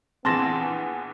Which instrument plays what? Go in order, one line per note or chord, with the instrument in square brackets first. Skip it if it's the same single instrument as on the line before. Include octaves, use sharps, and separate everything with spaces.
[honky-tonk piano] A#1 E3 G#4 [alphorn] B3 [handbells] C4 C6 A#6 [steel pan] A5